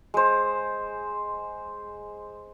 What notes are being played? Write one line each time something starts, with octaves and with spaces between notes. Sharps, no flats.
G#3 C5